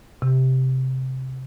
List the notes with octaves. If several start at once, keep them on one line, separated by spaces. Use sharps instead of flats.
C3